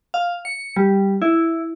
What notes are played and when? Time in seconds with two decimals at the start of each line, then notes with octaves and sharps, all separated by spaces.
0.14 F5
0.45 C#7
0.77 G3
1.22 E4